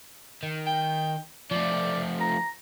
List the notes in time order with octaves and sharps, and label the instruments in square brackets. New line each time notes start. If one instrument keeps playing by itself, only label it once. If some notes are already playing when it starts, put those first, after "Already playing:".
[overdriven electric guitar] D#3
[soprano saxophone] G5
[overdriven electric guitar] F3 A3 [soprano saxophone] D5
[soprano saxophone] A#5